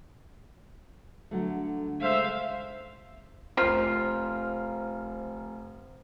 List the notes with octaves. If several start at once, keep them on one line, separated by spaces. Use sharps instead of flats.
D3 F#3 A3
C#3 G#3 A3 C5 E5 F5
F1 F4 A#4 C5